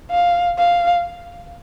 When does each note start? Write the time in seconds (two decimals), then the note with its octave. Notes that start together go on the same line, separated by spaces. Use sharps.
0.11 F5
0.58 F5